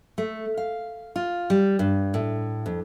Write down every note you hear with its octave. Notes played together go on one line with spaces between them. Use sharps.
A3
F5
F4
G3
G2
A2
F2